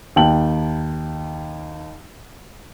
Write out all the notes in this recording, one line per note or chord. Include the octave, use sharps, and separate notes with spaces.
D#2 G5 A5 F#7